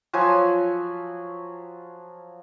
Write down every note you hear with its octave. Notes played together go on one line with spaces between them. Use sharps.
F3 F#3 G#5 B5